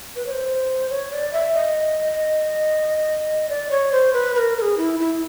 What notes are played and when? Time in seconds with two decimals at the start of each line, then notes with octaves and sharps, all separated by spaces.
0.16 B4
0.26 C#5
0.31 C5
0.90 C#5
1.12 D5
1.33 E5
1.55 D#5
3.49 D5
3.71 C#5
3.92 C5
4.13 B4
4.35 B4
4.38 A#4
4.57 A#4
4.62 G#4
4.77 E4
5.00 E4